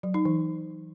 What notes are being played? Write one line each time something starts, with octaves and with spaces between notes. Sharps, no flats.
F#3
D#4
E3